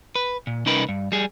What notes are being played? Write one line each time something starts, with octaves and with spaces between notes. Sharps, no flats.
B4
A#2
C2 C#4 D#4 A#4 B4
G2
G3 G#4